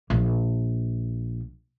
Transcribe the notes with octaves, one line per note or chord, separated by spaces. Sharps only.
A#1 A#3